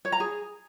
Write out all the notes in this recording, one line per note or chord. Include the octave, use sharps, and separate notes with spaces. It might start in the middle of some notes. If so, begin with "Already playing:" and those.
C#5
A#5
G#4